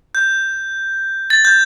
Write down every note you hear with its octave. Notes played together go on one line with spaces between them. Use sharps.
G6
A6
G6